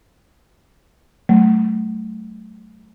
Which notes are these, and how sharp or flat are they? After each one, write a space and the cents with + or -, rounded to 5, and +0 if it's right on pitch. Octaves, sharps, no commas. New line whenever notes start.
F#3 +40 A3 +0